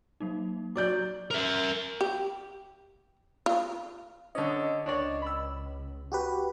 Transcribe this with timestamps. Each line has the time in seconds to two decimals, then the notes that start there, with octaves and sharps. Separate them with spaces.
0.20 F#3 A#3 D#4
0.76 F#3 D5 D6 G6 F#7
1.31 A#4 E5
2.01 G4
3.46 F4
4.35 D3 C#4 D#5
4.86 C#2 D4 C#5 D5
5.22 B5 E6
6.12 F#4 G4 B4